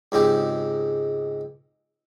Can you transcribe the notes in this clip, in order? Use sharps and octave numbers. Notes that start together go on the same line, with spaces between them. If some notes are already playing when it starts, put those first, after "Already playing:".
C#2 G#2 C4 G4